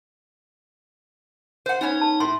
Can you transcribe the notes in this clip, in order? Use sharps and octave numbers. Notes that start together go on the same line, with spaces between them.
C5 F#5
B3 C#4 D#4 C#5
A5
A2 C6